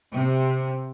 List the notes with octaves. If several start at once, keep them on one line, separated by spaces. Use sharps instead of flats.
C3